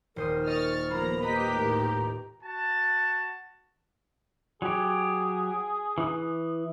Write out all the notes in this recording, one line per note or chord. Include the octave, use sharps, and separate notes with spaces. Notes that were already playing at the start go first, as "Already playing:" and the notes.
D#1 A#4 C5 D#6
D#5 C#6 F6 A6
F3 A#3 B3 A#4 A#5 B5
A#2 G4 B4 D#5 A#5 B6
A2 D#3
F#4 A5
F#3 G4 G#4
E3 D#6